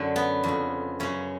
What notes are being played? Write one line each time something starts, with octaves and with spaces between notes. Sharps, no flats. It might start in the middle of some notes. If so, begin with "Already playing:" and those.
Already playing: F#2 D3 F#3
B3
F2 C#3
F#2 C#3 C#4